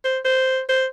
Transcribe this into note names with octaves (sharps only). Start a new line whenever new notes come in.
C5
C5
C5